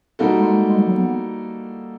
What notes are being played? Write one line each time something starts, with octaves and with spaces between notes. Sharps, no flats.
G3 A#3 D#4 F#4 A4
G#3
G#3
F#3
F#3
B3